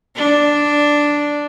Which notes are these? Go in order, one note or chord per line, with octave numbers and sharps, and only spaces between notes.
D4